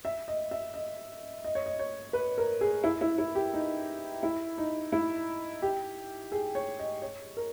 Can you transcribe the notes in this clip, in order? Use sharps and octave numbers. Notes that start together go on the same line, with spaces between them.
E5
D#5
E5
D#5
D#5
C#5
D#5
C#5
B4
A#4
G#4
E4
E4
E4
G4
D#4
E4
D#4
E4
G4
G#4
C#5
D#5
C#5
A#4